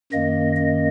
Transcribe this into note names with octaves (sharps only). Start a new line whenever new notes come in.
F#2 D#3 A#3 D#5
D#5